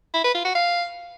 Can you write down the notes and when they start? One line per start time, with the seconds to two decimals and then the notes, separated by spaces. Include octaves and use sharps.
0.14 E4
0.24 B4
0.35 F4
0.45 F#4
0.55 F5